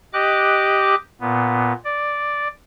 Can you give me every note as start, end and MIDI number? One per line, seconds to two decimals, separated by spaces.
0.13 0.95 67
0.13 0.95 75
0.13 0.95 86
0.13 0.95 90
1.21 1.73 46
1.21 1.73 59
1.85 2.48 74